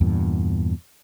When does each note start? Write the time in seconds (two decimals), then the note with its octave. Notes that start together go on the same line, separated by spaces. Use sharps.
0.01 E2 G2 A#2